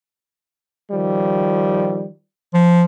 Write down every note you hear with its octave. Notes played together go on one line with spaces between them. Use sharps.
D#3 F3 G3
F3